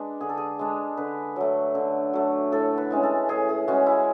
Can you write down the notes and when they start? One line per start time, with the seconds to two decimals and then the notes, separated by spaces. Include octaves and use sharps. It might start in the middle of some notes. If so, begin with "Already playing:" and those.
Already playing: G#3 D4 B4
0.21 D3 G#4
0.29 A4
0.37 G#4
0.59 G#3 D4
0.97 D3 B4
1.36 F#3 A3
1.75 D3
2.13 F#3 A3
2.52 A2 A4
2.77 B4
2.91 E3 G#3 C#4
3.03 A4
3.29 A2 G#4
3.49 G#4
3.68 E3 G#3 C#4 F#4
3.86 E4